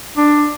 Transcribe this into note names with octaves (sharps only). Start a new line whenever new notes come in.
D4